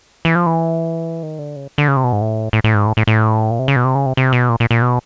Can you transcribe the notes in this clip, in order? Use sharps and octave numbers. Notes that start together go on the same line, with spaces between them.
E3
F3
E3
D#3
D3
C#3
D3
C#3
C3
B2
G#2
A2
A2
A2
G#2
A2
A2
A2
A#2
C3
C#3
B2
C3
C#3
C3
C3
B2
A#2
A#2
A#2
B2